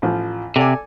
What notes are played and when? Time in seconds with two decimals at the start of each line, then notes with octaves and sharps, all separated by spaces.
0.02 A1 F3
0.56 C3 A4 D5 G#5